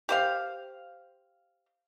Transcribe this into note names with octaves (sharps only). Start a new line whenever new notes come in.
G4 C5 F5